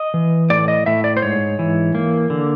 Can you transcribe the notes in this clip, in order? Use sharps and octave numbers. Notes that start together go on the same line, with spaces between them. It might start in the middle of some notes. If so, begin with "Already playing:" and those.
Already playing: D#5
E3
A2 D5
D#5
A2 E5
D5
C5
G#2 C#5
E3
A#3
D3